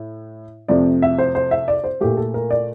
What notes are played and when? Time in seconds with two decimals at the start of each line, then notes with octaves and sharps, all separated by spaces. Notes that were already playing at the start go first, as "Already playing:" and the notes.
Already playing: A2
0.68 F2 C3 F3 A3 D5
1.02 E5
1.18 C5
1.35 C5
1.51 E5
1.68 D5
1.84 C5
2.01 A#2 A3 G4
2.17 A4
2.34 A#4
2.51 D5